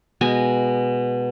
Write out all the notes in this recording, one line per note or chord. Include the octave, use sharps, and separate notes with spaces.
B2 G#3 D#5 G#5